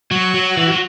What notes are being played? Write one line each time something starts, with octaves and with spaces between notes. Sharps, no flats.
F#3 F#4
F#3
E3
F#3